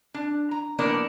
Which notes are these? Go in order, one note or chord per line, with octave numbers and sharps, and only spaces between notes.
D4
A#5
A2 F3 A#3 B3 D4 A#4